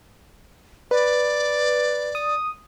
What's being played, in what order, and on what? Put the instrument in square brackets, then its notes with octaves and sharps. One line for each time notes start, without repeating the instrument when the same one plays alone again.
[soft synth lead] B4 [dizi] D5
[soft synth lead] D#6